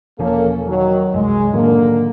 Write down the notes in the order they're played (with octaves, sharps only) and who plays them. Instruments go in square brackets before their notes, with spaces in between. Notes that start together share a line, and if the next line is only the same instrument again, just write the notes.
[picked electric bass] E1 F3 [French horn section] A#3 C#4 A4
[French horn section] D#3 F#3
[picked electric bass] C2 F#2 [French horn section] G#3
[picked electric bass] A2 D#3 F#3 [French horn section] D3 A#3